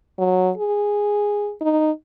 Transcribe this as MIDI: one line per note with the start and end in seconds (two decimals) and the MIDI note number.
0.19 0.50 54
0.58 1.52 68
1.61 1.91 63